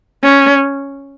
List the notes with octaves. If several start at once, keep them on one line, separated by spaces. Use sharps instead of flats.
C#4